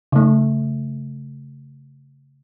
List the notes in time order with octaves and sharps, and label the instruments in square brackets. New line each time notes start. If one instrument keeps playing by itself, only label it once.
[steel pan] C#3 A3